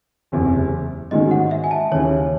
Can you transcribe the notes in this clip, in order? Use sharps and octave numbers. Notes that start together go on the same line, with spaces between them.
F#1 E2 C3
G#2 D#3 G#3 C#4 F#4 D#5
F#5
E5
G#5
A5
D#2 C#3 E3 C#5